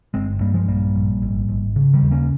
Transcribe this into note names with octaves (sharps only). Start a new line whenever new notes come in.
G1 G#3 C4
G2 G3 A#3
F3 G#3
A#1 G3 A#3
A#1
G#1
G#1
C#3
D#3 G3
D#2
A#3 C#4